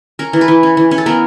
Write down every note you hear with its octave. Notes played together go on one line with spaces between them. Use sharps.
C#4 A#4
E3
B4
E3
C#4
E3
C#4
A4
B3 A#4